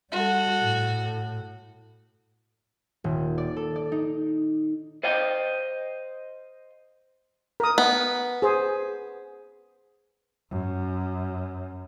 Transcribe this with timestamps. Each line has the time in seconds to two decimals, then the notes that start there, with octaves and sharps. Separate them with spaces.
0.12 G3 F#4 A4
0.62 A2
3.04 D#1
3.38 D5
3.57 A4
3.76 D5
3.92 D#4
5.03 C5 D#5 F5 G5
7.60 A#4 D#6
7.78 B3
8.42 G#4 C5
10.50 F#2